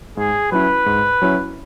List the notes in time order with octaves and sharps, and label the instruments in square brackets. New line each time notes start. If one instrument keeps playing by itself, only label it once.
[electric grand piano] G#2 [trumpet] G#4
[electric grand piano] F#3 C#4 E4 [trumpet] B4
[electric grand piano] G#2
F#3 C#4 E4